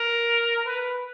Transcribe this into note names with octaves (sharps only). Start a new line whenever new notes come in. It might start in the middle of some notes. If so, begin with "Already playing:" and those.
Already playing: A#4
B4